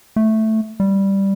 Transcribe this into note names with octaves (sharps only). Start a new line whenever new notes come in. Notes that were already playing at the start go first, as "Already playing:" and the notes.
A3
G3